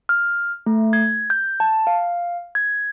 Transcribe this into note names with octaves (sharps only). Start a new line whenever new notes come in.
F6
A3
G#6
G6
A5
F5
G#6